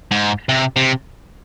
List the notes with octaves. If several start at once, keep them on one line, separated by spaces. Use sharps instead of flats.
G#2
C3
C3